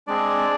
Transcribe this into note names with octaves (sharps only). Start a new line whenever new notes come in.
G#3 C4 D4 G#4 D5